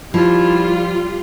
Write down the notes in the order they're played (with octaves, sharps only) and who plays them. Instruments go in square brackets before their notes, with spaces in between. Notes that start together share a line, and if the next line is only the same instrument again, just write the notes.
[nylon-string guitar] F3 [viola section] G3 F4 [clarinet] E4